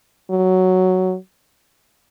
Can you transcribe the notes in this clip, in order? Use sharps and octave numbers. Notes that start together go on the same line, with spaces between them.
F#3